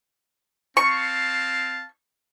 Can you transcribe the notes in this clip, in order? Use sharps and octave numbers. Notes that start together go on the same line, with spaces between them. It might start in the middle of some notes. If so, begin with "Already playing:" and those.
C4 F5 A5 C#6